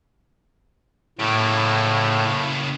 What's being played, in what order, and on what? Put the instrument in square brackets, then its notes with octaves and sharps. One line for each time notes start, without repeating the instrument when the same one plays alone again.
[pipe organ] A2 [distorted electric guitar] C#3 A#3